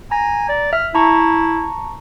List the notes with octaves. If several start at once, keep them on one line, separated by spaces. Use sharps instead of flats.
G#5 A#5 A#6
D5
E5 F6
E4 A5 A#5 C#6